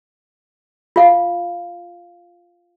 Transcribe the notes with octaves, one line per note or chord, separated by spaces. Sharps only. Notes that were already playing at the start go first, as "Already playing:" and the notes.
F4 F5